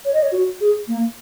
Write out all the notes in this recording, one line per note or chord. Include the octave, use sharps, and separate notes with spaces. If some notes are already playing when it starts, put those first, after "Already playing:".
C#5
D#5
C#5
F#4
G#4
A#3